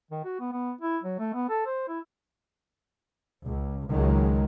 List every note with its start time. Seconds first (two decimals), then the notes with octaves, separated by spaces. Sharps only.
0.11 D#3
0.24 F#4
0.40 B3
0.52 B3
0.81 E4
1.03 F#3
1.19 A3
1.34 B3
1.49 A4
1.66 C5
1.88 E4
3.44 C#2
3.90 C#2 D#3 F#3 G#3